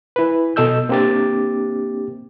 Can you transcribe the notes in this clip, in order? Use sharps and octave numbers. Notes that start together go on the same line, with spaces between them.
E4 B4
B2 A4 D#5 E6 G6
A#3 C4 D4 G4 D6 A6